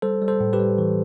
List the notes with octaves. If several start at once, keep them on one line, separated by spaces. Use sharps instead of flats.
G3 A4 C5
G3
A4 C5
A2
G4 B4
G3
E3